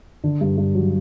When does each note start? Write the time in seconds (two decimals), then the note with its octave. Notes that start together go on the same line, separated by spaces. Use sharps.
0.24 D3
0.41 G2
0.57 G2
0.75 F#3